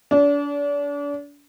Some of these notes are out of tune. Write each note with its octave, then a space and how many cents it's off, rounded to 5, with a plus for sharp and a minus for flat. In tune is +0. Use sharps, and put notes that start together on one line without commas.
D4 -35